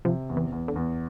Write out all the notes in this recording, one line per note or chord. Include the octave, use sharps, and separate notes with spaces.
C3 F3
E2
E3
E2
D3
E2